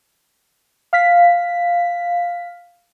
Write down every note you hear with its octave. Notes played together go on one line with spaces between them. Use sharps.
F5 B6